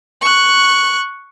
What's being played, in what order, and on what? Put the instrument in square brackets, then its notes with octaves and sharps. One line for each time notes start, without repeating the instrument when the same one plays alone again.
[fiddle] C#6 F#6